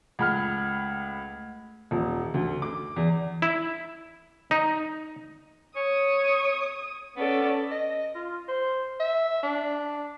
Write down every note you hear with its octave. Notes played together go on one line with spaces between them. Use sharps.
C#2 A3 F#5 B5 F6 G#6
D#1
D2
D6
E2
E4
D#4
C#5 D#6
B3 C#4 A4 D5
D#5
F4
C5
E5
D4